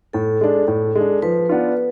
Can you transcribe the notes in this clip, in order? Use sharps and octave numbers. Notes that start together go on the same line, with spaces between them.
A2 A4
G#3 D4
A2
G#3 D4
F3 B4
B3 D4 F4